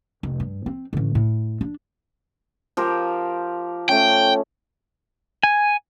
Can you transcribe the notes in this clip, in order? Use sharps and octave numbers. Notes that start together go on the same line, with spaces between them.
F1
G2
C4
A1 D3
A2
D4
F3 G4 A#4
A3 C#4 G5
G#5